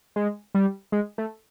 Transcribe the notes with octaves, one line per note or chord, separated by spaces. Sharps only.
G#3
G3
G#3
A3